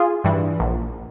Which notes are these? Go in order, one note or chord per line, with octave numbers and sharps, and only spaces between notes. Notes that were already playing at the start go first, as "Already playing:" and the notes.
Already playing: F4 G#4
G2 E3
A#1